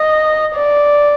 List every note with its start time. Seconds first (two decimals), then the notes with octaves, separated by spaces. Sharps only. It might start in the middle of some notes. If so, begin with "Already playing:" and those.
Already playing: D#5
0.54 D5